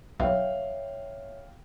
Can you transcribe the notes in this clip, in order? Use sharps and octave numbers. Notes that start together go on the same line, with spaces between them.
B1 C#5 E5 F5 G5